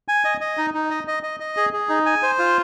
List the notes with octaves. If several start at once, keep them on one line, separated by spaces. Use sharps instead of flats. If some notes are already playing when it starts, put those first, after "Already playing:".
G#5
D#5
D#5
D#4
D#4
D#5
D#5
D#5
D#5
G#4
G#4
D#4
G#5
C5
F4